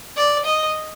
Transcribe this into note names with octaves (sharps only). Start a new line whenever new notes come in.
D5
D#5